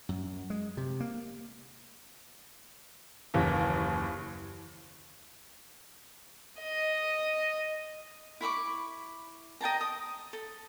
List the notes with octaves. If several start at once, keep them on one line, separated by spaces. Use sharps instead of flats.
F#2
G#3
C3
A#3
F#1 D#2 E3
D#5
E4 B5 C#6 D6
D#5 G5 A5 A#5
D#6
A4